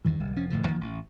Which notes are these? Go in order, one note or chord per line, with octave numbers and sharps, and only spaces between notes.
E2 G2 D#3 E3
D1 C2 G3
F1 F3 C#4
E1 A2 D3 F3
D#2 D#3 F3 A#3
A1